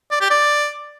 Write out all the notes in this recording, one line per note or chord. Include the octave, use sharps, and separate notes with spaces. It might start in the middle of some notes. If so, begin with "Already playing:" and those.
D5
G4
D5